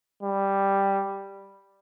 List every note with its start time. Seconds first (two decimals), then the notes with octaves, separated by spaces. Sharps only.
0.23 G3